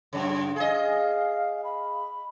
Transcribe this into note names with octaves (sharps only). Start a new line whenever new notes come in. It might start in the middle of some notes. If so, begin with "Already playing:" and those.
F#2 C#3 C#5
G#4 D#5 F5
B5